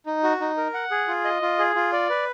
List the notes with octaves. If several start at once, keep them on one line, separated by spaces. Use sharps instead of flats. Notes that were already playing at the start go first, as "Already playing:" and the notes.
D#4
F#4
D#4
A#4
F#5
G#4
F4
D#5
F4
G#4
F4
D5
B4